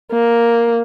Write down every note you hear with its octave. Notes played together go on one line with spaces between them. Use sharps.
A#3